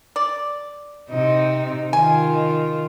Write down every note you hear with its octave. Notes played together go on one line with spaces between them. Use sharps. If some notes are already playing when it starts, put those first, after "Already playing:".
D5
C3 D#4
D#3 F4 G#5